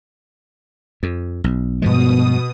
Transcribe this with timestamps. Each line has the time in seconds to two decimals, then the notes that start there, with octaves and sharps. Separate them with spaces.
1.03 F2
1.44 B1
1.82 G2 B2 F3 G#3 D#6